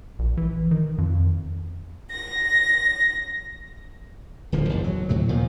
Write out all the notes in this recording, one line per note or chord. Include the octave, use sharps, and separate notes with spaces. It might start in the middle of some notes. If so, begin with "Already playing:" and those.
A#1
E3
D#3
F2
A#6
D1 D3 F3
F#1 E2 G#2
F#3
D2 A2 C3 F#3
A#2 D#3 F3